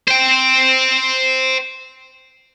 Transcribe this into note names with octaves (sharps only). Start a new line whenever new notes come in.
C5 G5